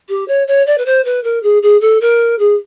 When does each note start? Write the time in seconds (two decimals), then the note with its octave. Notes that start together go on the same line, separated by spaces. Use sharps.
0.09 G4
0.28 C#5
0.47 C#5
0.66 D5
0.78 B4
0.86 C5
1.05 B4
1.24 A#4
1.43 G#4
1.62 G#4
1.81 A4
2.01 A#4
2.39 G#4